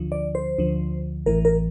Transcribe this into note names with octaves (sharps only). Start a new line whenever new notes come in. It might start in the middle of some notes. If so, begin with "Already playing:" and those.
Already playing: D2 D3 F3
D5
C5
D2 D3 F3
A1 A2 E3 A#4
A#4